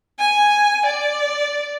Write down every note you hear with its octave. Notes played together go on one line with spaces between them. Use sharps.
G#5
D5